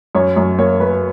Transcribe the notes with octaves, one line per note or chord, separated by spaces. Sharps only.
F#2 C#5
F#2
A#3 C#5
A#3 B4